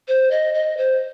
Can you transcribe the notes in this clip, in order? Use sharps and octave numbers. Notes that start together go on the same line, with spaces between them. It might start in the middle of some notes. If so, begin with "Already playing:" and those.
C5
D#5
D#5
C5